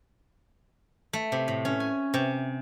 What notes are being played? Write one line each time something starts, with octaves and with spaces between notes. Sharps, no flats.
A3
C3
A2
C#4
G#5
C3